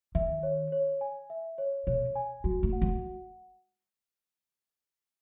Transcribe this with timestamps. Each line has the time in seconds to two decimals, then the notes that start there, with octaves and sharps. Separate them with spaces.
0.15 D#3 E5
0.43 C#5
0.72 C#5
1.01 G#5
1.30 E5
1.58 C#5
1.87 B2 C#5
2.15 G#5
2.44 F#3 F#4
2.63 A3
2.73 F#5
2.82 G#3